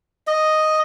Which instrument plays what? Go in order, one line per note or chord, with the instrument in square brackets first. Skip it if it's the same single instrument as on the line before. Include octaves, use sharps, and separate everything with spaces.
[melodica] D#5